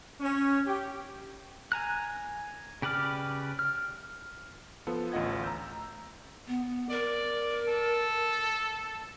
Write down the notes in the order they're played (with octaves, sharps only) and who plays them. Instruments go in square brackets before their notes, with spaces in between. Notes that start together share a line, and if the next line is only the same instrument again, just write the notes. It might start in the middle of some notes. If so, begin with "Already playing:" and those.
[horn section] C#4
G4
[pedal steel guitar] G#5 A#5 F#6
C#3 G4 B4 D5 F6
F6
[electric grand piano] F3 B3 F4 A4
A1 D2 F4 D#5 F#5 G#6
A#5 E6 G6
[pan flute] B3
[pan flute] A#4 [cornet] D5
[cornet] A4